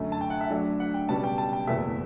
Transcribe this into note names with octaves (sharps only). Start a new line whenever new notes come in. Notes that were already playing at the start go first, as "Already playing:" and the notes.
Already playing: F#2 D3 A3
A5
G5
F#5
E5
D2 D3 F#3 A3 D4
F#5
G5
C#2 B2 G3 C#4 A5
G5
A5
G5
F#1 E2 B2 A3 E5